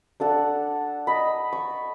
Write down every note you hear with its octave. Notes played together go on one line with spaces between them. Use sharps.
D4 A4 F#5
D#5 B5
C#6